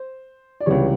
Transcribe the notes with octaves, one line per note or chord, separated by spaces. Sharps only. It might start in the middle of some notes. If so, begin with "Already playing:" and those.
Already playing: C5
D5
C#2 C3 E3 G3 C#5